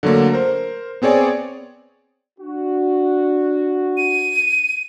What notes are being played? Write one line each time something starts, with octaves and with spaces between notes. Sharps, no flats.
D3 F#3 A3 A#3
A#4 C5
B3 C4 G#4 C#5 D5 G#5
D4 F#4
D#7